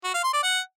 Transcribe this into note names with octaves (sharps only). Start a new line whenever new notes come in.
F#4
F5
C6
D5
F#5